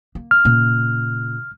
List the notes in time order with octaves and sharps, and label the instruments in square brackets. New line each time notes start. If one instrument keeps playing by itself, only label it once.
[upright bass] A#3
[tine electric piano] F6
[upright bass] A#2 C#3